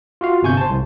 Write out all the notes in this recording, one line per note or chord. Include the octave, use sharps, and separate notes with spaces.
F4 F#4 F5
G1 C3 G#5 C#6 G6
C5 A5
C2